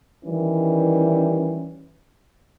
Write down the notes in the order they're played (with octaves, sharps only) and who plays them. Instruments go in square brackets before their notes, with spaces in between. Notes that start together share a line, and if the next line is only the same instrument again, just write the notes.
[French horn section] D#3 E3 G3 C#4